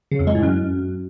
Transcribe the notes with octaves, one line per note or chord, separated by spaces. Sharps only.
C#3
F2
G#3
A2
F#2